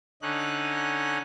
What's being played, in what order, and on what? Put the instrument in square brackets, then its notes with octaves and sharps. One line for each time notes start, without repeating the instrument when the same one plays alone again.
[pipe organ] D3 C#4 D#4 F#6